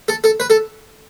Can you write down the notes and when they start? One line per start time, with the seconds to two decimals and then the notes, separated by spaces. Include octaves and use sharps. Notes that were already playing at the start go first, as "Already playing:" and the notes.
0.08 A4
0.24 A4
0.40 B4
0.50 A4